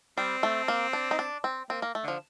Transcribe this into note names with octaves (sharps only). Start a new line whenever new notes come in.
G3 C4
A3
A#3
D4
D#4
D4
C4
A#3 C4
A#3
A3
D3 F3